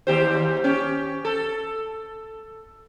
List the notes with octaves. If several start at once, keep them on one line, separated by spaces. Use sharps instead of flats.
D#2 G4 C5
C#4 G4
A4